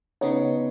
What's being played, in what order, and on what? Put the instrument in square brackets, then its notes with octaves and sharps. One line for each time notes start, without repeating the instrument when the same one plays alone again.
[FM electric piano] C#3 B3 D#4 [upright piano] C#5